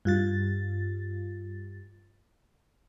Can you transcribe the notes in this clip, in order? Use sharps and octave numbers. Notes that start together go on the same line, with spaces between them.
G2 F4 A6